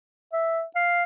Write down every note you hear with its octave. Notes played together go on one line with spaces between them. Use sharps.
E5
F5